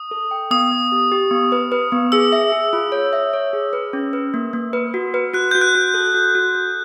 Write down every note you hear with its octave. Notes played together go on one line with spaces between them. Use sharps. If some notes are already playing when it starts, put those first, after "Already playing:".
Already playing: D#6
A4
G5
B3 D#6
B3
G4
G4
B3
B4
B4
B3
G#4 E6
E5
G#4
F4
C#5
E5
C#5
G#4
B4
C#4
B4
A#3
A#3
B4
F#4
B4
F#4 F#6
F#4 G6
F#6
F#4
A4
F#4
F#4
A4